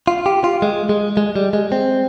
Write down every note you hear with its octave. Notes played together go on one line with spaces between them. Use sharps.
F4
G4
F4
G#3
G#3
G#3
G3
G#3
C4